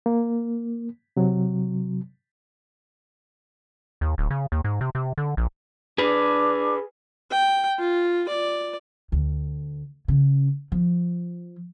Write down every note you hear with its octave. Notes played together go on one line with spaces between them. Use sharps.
A#3
C3 F#3
D#2
D1
C#3
D#2
G#2
C3
C3
D3
A#1
D4 G#4 B4
G5
F4
D5
D2
C#3
F3